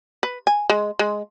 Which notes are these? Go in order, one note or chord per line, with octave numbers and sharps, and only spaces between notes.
B4
G#5
G#3
G#3